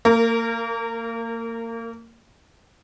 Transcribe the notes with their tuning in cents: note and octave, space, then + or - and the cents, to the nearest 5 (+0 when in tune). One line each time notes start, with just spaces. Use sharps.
A#3 -30 A#4 +0